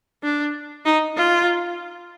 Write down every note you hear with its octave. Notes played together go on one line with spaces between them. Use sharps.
D4
D#4
F4